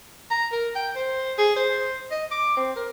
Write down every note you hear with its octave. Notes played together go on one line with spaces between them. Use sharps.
A#5
A#4
G5
C5
G#4
C5
D#5
D6
C4
A#4